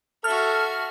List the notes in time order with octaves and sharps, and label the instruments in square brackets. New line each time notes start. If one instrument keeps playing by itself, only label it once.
[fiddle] F#4 E5 [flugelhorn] A4 [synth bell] F6